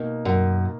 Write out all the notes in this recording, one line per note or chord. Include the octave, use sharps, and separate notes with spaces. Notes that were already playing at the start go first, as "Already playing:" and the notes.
Already playing: B2 A#3 D#4
F#2